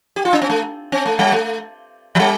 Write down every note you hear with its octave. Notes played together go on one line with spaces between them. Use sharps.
G4
F4
D4
C4
A3
C4
A3
G3
A3
F3
G3